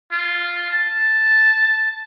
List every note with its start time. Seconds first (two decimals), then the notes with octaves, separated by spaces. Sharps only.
0.12 F4
0.71 A5